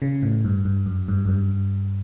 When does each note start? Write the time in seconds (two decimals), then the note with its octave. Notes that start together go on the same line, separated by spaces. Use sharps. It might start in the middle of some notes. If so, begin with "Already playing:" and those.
0.02 C#3
0.23 A2
0.45 G2
0.65 G2
0.86 F#2
1.08 G2
1.25 F#2
1.29 G2